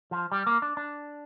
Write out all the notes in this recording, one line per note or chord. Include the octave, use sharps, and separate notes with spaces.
F3
G3
A#3
D4
D4